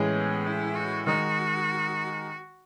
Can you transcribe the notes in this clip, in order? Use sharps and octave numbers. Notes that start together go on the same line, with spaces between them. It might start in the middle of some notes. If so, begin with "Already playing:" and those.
Already playing: A2 E3 G#3 C#4 G#4
B3
E4
F#4
D#3 G#3 D#4 F#4